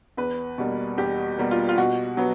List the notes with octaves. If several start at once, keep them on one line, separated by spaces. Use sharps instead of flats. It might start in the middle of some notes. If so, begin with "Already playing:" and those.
E2 B4
B2 G3 A#3
E2 G4
B2 G3 A#3
F4
F4
B2 F#4
F#3 B3